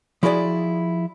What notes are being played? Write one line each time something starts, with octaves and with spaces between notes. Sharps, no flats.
F3 E4 F#4 G#4 B4 D5